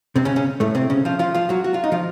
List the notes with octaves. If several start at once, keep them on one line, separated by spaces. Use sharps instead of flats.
C3 C4
C#3 C#4
C#3 C#4
A2 A3
C3 C4
C#3 C#4
F3 F4
F3 F4
F3 F4
F#3 F#4
F#4
F4
D#4
F3 F4